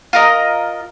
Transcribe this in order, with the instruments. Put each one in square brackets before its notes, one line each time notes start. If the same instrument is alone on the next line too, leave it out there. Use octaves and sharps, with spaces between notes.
[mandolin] F4 A#4 D#5